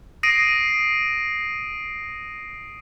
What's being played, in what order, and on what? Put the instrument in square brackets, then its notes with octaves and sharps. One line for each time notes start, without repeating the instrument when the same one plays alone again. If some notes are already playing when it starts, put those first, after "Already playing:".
[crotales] D#6 A#6 C7 D7 D#7